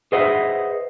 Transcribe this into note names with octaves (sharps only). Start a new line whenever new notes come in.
G#4 B4 C5 D#5 E5 F#5